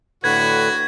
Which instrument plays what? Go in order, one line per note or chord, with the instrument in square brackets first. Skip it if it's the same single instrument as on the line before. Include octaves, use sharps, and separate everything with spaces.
[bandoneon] A2 D3 B4 [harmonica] F#4 [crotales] G#6